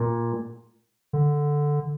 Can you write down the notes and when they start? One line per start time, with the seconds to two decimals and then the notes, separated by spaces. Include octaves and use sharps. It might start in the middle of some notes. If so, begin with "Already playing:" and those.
Already playing: A#2
1.13 D3